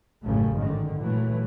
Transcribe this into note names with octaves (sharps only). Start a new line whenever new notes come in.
A1 F#2 A2 C#3 A3
G#2 D3 D#3
A#2 E3 F#3 A3